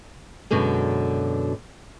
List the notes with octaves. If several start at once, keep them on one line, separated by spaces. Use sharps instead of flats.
F#2 B2 D3 G#3